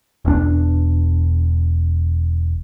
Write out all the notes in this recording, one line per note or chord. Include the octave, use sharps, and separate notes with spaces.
E1 E2 C#4 D4